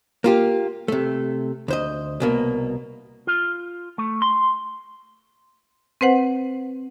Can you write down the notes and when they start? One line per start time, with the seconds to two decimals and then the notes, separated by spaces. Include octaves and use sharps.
0.24 A#3 F4 G4
0.88 C3 A3
1.68 D2 C5 D#5
2.20 C2 B2 A#3
3.27 F4
3.98 A3
4.22 C6
6.01 C4 B4 C5 F#5